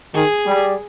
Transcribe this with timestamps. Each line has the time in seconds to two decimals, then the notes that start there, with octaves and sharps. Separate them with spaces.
0.15 D#3 G#4
0.46 G3